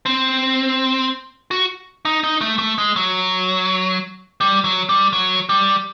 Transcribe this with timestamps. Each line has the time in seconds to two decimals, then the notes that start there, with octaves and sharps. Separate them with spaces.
0.06 C4
1.51 F#4
2.05 D#4
2.24 D#4
2.41 A3
2.59 A3
2.78 G#3
2.96 F#3
4.41 G3
4.64 F#3
4.89 G3
5.13 F#3
5.49 G3